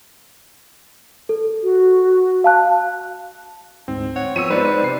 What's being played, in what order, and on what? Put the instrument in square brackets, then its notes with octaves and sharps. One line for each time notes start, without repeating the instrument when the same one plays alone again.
[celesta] A4
[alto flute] F#4
[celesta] F5 A5 F#6
[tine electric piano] D2 G#2 [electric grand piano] C4
[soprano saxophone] C#5 [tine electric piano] F#5
[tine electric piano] F3 B3 [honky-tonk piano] E6 C#7 D#7
[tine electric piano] G#3 D#4 [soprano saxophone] B4 [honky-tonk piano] C5 D5
[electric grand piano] C3 C7